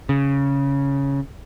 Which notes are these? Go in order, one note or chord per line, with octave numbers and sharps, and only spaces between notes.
C#3